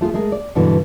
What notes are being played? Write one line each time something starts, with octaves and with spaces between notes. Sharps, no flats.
A3 F4 F#4 G#4
G#3 A3 G#4 A#4
D5
G2 B2 D3 E3